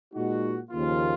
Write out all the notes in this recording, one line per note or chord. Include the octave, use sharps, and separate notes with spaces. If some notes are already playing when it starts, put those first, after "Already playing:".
A#2 G#3 D#4 F#4
D#2 C#3 F3 A#3 F4